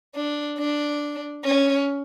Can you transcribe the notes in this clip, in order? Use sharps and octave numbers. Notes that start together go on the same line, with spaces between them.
D4
D4
C#4